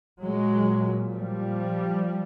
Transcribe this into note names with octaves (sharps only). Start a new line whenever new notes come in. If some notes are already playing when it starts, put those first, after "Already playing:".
A#2 F#3 G#3
F3 G3